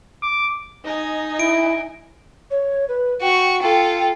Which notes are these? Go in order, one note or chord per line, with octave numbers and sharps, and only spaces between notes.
D6
D#4 D#5 G#5
E4 D7
C#5
B4
F#4 G5 C#6
F4 A4 G5